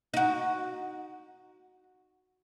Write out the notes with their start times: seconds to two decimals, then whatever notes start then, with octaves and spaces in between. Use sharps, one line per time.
0.14 D#4 F#4